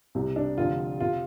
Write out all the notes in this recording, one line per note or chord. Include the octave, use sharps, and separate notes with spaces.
C2 C3
D4
F1 F2 D3 F4
C3 F4